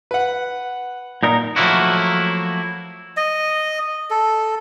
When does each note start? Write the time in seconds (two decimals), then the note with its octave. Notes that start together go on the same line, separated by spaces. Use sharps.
0.11 B4 F#5
1.23 A#2 D#4 A#4
1.56 F3 F#3 A3 A#3 E4 F#4
3.17 D#5
4.11 A4